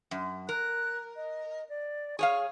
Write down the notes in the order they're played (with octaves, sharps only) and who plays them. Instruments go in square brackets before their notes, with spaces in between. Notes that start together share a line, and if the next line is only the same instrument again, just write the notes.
[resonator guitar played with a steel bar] F#2
[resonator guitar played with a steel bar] A#4 [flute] F#6
[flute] D#5
D5
[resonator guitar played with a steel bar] G#4 C#5 F5 [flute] C#6